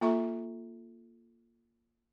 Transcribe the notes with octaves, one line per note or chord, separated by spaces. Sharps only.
A#3 F4 A4 E5 A#5 C#6